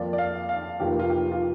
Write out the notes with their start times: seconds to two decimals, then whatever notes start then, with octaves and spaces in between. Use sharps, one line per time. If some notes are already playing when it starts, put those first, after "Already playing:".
Already playing: F2 F3 A#3 D5
0.13 D5
0.18 F5
0.49 F5
0.79 F1 F2 F3 A#3 G4
0.99 F4
1.10 G4
1.32 F4